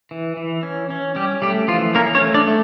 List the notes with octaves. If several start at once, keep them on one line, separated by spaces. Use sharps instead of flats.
E3
E3
C#4
C#4
G3 C#4 G4
G3 A3 G4
E3 F3 F4
A#3 C#4 A#4
C#4 C#5
A3
D4 D5
A3